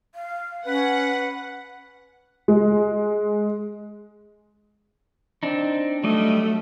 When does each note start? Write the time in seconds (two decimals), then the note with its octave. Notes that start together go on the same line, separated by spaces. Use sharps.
0.15 F5
0.66 C#4 B4 F#5
2.48 G#3
5.43 C4 D4 D#4
6.04 F#3 G3 A3 D#5